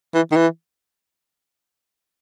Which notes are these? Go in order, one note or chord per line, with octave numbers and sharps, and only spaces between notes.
E3
D#3
E3